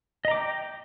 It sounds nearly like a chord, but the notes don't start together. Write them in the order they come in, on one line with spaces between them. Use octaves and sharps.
D#5 A#5 D6 G5